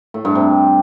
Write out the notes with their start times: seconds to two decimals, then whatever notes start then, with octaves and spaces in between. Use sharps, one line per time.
0.14 A2
0.25 G2
0.35 C3